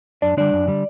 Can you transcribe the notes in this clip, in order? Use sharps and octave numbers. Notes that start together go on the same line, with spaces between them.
F#2 D4 D5
D3 G3 D4 D5
F#2
D3 G3